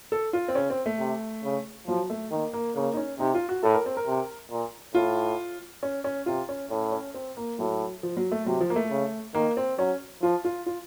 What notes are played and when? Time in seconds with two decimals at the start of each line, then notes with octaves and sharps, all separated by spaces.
0.12 A4
0.33 F4
0.48 C4
0.55 C#3 C#4
0.70 C4
0.86 A3
0.99 C3
1.44 C#3
1.87 F3 F#3
2.10 A3
2.31 D#3 A#3
2.53 A#3
2.75 C#3 A#3
2.94 D#4
2.97 C#4
3.19 C3 D#4
3.34 F4
3.49 F#4
3.63 A2 A4
3.74 A#4
3.86 C4
3.97 A#4
4.07 C3
4.51 A#2
4.95 A2 F4
5.83 C#4
6.04 C#4
6.26 C3 F4
6.49 C#4
6.71 A2 C#4
6.92 C#4
7.14 C4
7.37 A#3
7.59 A2 F#3
8.03 F3
8.17 F#3
8.32 A3
8.46 C3 F#3
8.61 F3
8.70 A#3
8.76 A3
8.90 C#3
9.34 D#3 A#3
9.57 C4
9.79 F#3 C#4
10.22 F3 F4
10.45 F4
10.66 F4